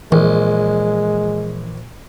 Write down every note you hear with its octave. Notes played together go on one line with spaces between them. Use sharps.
A#1 E3 G#3